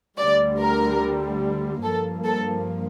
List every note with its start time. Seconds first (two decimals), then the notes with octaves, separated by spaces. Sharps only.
0.18 D2 D3 G3 D5
0.59 A#4
1.83 G2 F3 A#3 A4
2.24 A4